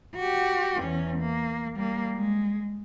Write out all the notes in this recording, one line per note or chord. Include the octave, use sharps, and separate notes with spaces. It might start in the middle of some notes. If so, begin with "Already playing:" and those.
F#4 G4
E2 C#4
A#3
G3 A#3
G#3